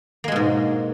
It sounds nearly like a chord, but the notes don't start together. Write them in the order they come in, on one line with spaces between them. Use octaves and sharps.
A#3 G#3 B2 G#2